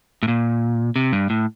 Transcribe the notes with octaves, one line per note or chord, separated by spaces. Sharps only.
A2
A#2
C3
G2
A2